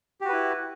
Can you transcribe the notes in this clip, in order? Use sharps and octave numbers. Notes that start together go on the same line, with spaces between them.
E4 F#4 G4 B4